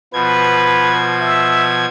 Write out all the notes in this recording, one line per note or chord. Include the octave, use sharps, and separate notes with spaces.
B2 F3 B4 G#6
E5